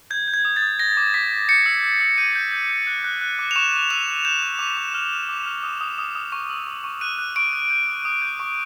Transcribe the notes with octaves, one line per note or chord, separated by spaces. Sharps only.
G6 G#6
G6
G#6
D#6
A6
D#6
G6 A#6
D6
D6 B6
G6
G6 C#7
E6
E6
E6
G6 D#7
G6
G6
G6
F#6
F#6
F#6
D6
F7
C#6 E7
C#6
E6 F7
E6
G6 E7
D6
D6
D6
F6
F6
D6
F6
D#6
D#6
D#6
D#6
C#6
E6
C#6
C#6
F#6 D#7
F#6
C#6 D7
F#6
G6
D#6
D#6
G6
C#6